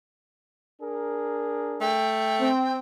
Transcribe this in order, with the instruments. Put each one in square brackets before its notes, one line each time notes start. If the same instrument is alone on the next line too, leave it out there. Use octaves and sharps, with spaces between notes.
[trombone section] D4 G#4 A#4
[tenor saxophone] A3 [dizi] G5
[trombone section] C4